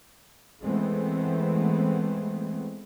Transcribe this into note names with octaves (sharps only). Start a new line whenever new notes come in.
E3 G#3 A3 B3 C4